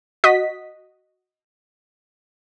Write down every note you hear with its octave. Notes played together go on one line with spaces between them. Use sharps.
F#4 D#5 B6